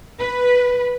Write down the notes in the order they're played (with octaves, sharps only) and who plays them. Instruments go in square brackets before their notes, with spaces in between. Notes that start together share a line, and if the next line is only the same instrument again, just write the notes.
[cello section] B4